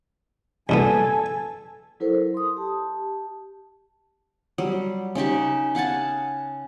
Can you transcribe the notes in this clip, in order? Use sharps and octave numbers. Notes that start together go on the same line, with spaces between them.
C2 A#2 B3 A4 G#5
F#3 E4 A4 A#4 C5
C6 D#6
G4 A5
F#3 G3
C#3 D#4 G4 C#6
F5 F#5 G#5 A5